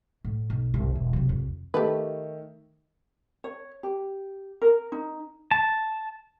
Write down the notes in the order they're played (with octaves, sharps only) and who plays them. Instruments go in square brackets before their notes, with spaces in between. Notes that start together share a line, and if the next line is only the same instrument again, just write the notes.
[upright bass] A2
B1
C2 G2
E1
C3 F#3
C2 F2
[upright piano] D#3 A3 [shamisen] G4 A4 B4
[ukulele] C#5
G4
A#4
D#4
[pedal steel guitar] A5